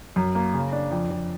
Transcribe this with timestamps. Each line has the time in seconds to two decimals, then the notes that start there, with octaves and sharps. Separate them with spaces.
0.16 F#2
0.35 A#3
0.54 C#3
0.72 D4
0.91 F2
1.10 F2